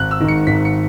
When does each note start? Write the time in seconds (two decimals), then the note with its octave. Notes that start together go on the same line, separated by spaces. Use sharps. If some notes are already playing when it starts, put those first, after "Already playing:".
Already playing: G#1 F#6
0.11 E6
0.20 G#2 D#3
0.28 C#7
0.47 G#1 B6
0.65 C#7